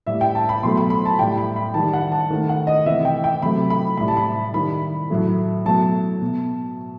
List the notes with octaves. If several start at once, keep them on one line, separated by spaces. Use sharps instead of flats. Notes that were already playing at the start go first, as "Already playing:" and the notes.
A2 G3 E5
G5
A5
B5
B2 F#3 A3 C6
B5
B5
A5
A2 G3 G5
B5
B5
D#3 G3 A5
F#5
A5
D#3 A3
F#5
D#5
C3 E3 A3 E5
G5
G5
C3 F#3 A3 B5
B5
A2 G3 B5
A5
B5
D#3 G3 B5
A2 F#3 A3
B2 F#3 A3 A5
B2